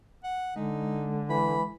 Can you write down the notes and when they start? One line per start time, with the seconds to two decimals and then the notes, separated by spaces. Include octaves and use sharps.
0.24 F#5
0.56 D3 G#3 D#4
1.30 E3 B5